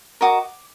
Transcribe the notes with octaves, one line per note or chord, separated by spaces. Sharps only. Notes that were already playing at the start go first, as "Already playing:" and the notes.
F#4 A#4 D#5 D6